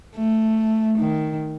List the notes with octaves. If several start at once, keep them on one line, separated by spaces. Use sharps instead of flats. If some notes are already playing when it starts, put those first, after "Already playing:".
A3
D#3